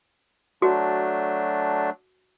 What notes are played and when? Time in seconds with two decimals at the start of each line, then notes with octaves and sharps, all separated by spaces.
0.62 F#3 A3 D4 F#4